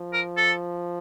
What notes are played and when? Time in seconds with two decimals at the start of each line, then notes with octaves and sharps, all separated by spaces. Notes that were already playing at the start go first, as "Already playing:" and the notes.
Already playing: F3
0.13 A#4
0.37 A4